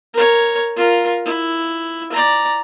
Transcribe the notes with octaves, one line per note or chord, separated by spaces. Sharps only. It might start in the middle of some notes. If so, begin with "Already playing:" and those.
A#4 C#5
F4 A#4
E4
D5 A#5